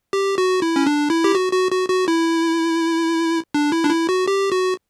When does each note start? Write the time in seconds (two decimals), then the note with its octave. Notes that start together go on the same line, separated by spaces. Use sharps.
0.13 G4
0.38 F#4
0.62 E4
0.76 C#4
0.86 D4
1.10 E4
1.24 G4
1.35 F#4
1.53 F#4
1.72 F#4
1.89 F#4
2.08 E4
3.54 D4
3.72 E4
3.84 D4
3.90 E4
4.09 F#4
4.28 G4
4.52 F#4